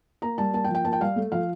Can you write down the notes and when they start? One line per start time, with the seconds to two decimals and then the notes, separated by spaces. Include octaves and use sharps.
0.22 A#3 A#5
0.38 G3 A5
0.53 A#3 A5
0.64 G5
0.69 F3
0.75 G5
0.84 A#3 A5
0.93 G5
1.01 G3 F5
1.16 A3
1.32 F3 F5